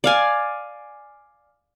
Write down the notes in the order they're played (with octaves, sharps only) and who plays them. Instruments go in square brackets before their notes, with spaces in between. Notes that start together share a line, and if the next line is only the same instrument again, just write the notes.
[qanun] D5 F5 G#5